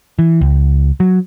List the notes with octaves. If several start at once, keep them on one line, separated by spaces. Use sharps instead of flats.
E3
C#2
F#3